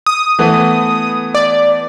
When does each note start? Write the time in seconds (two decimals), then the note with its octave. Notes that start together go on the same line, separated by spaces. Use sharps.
0.06 D#6
0.39 E3 A3 B3
1.34 D5